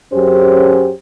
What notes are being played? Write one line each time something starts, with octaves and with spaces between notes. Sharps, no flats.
F#2 F#3 C#4 G4 G#4 C5